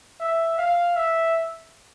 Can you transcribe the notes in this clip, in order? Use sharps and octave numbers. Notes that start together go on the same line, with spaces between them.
E5
F5
E5